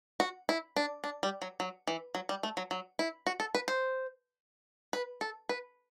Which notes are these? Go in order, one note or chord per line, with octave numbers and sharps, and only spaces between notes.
F#4
E4
D4
D4
G3
F#3
F#3
E3
F#3
G3
A3
F#3
F#3
E4
F#4
A4
B4
C5
B4
A4
B4